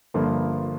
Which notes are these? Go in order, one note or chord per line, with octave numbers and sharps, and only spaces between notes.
G1 G2 F3 A#3 F4